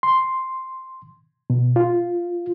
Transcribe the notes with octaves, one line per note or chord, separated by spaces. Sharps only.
C6
B2
F4